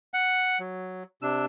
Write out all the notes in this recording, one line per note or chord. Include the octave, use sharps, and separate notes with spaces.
F#5
F#3
C3 D4 E6